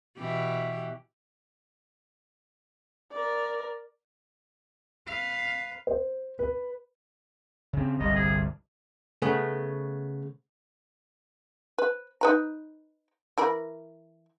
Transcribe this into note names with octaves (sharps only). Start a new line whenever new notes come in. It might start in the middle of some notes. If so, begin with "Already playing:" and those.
B2 E3 G4
A#4 D5
B4 F5
C5
B4
C#3 C4
G1 C2 D3 D#5
G#4
C#3 A3 B3
B4
D#4 B4 A#5
E3 A#4 B5